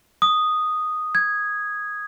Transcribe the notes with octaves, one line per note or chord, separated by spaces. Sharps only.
D#6
G#6